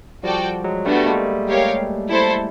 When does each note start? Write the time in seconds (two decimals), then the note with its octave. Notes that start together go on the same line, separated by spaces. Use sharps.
0.23 F3 G3 F#4 A4 D5 G5
0.64 F#3 G#3
0.85 G3 A3 B3 D4 F#4 A4
0.95 G3 A3
1.06 G#3 A#3
1.48 G4 A#4 C#5 F5
2.09 E4 A4 C5